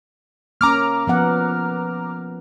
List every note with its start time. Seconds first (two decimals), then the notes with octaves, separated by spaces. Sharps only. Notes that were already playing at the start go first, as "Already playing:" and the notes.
0.61 A#3 C#4 A#5 D6 F6
1.07 F3 B3 F#5